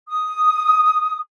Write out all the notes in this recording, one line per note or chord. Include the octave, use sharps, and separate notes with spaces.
D#6